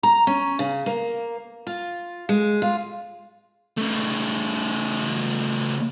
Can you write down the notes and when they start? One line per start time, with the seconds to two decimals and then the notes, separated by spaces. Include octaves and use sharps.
0.03 A#5
0.27 C#4
0.59 C#3
0.86 A#3
1.67 F4
2.29 G#3
2.62 F4
3.78 C#3 A3